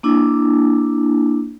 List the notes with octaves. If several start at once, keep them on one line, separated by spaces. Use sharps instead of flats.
A#3 D4 E4